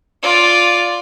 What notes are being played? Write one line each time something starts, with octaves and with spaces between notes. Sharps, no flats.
F4 D5